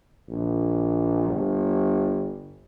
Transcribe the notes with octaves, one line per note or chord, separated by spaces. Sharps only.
A#1
G1